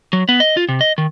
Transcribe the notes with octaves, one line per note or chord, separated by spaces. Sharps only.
F#3
B3
D#5
F4
C3
D#5
D#3